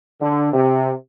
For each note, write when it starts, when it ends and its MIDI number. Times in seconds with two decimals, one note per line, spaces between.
0.21 0.51 50
0.53 0.92 48